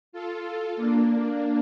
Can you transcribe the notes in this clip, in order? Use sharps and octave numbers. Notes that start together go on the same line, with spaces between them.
F4 A4
A#3 D4